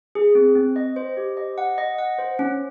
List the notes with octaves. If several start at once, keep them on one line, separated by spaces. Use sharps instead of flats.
G#4
C4
C4
D#5
C5
G4
D#5
F#5
D#5
F#5
C5
C#4